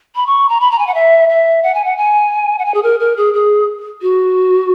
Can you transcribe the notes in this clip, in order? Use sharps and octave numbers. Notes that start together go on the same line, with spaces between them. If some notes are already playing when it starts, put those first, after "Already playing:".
B5
C#6
A#5
B5
A#5
G#5
F#5
E5
E5
F#5
G#5
F#5
G#5
F#5
G#5
G#4
A#4
A#4
G#4
G#4
F#4